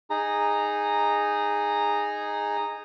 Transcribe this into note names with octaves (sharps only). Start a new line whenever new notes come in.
D#4 G#4 A#5